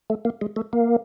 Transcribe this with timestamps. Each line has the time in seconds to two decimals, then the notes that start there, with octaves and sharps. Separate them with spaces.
0.10 A3
0.25 A#3
0.41 G#3
0.56 A3
0.73 A#3